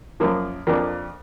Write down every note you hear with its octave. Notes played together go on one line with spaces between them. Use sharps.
F#2 F3 A#3
F2 F3 A#3 D4